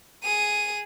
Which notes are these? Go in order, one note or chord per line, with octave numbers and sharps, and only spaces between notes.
G#4 D#7